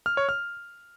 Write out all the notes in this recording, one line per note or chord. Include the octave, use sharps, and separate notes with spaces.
F6
C#5
F6